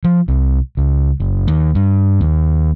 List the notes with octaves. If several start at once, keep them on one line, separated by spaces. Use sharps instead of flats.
F3
C2
C#2
F#1
D#2
G2
D#2